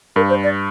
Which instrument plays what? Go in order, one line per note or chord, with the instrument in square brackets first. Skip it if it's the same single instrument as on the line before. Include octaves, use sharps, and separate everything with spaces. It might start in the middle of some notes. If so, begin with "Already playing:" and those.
[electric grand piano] G2 [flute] A#4
[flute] C5
D5